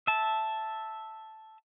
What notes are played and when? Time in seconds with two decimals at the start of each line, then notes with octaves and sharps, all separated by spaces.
0.07 E5 A5